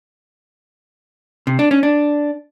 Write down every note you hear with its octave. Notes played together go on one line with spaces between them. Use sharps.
C3
D4
C#4
D4